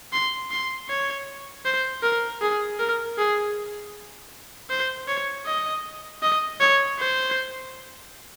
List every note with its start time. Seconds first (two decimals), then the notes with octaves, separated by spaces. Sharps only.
0.13 C6
0.51 C6
0.89 C#5
1.65 C5
2.03 A#4
2.41 G#4
2.79 A#4
3.18 G#4
4.70 C5
5.08 C#5
5.46 D#5
6.22 D#5
6.60 C#5
6.99 C5